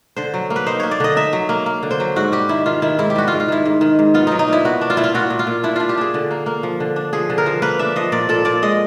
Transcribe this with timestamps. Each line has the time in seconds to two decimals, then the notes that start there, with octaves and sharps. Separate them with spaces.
0.17 D3 C5
0.34 F#3
0.50 A#3
0.56 B4
0.66 D#4 C5
0.80 A#3 C#5
0.91 D5
1.00 D3 D#5
1.16 D#4 E5
1.33 F#3
1.49 A#3
1.66 A#3
1.83 D3
1.91 C5
2.00 F#3
2.16 G#2 F#4
2.32 G3 G4
2.49 D#3 E4
2.66 D#3 F4
2.82 D#3 E4
2.99 G#2 E4
3.10 G4
3.16 G3 F#4
3.28 G#2 F4
3.40 F4
3.48 D#3 E4
3.66 G#2
3.81 D#3
3.99 G#2
4.14 B3 F4
4.27 F#3 D#4
4.39 D#4
4.48 A#2 E4
4.65 B3 F#4
4.81 D4
4.90 F4
4.97 A#2 E4
5.04 F4
5.14 A#2 F#4
5.30 A#2
5.39 F4
5.47 A#2
5.63 D4 E4
5.76 D4 F4
5.89 G4
5.98 D4 G#4
6.14 D3
6.31 A#3
6.46 A#3
6.63 F3
6.80 D3
6.96 D4
7.13 F3 G#4
7.30 D3
7.38 A#4
7.46 F3
7.62 A#3 B4
7.79 D4 E5
7.96 F3 D#5
8.12 A#2 D5
8.29 A#2 A4
8.45 A#2 D5
8.62 G#3 D#5